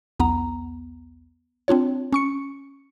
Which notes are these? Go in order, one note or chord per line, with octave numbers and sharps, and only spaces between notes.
B1 E2 B3 A#5
C4 D4 F4 C#5
C#4 C#6 C#7